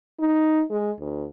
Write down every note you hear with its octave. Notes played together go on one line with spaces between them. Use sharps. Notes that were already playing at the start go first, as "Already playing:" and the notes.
D#4
G#3
D2